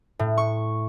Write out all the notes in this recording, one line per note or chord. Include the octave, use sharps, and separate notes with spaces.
A2
C#6